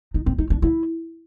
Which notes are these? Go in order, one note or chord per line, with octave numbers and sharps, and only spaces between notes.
D#4
C4
D#4
D4
E4